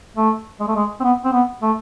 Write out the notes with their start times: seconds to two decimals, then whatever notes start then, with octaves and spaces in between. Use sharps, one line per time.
0.16 A3
0.60 G#3
0.67 A3
0.75 G#3
1.00 C4
1.03 B3
1.24 C4
1.33 B3
1.62 A3